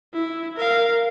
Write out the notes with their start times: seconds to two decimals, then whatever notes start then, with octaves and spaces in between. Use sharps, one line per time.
0.14 E4
0.57 A#4 F5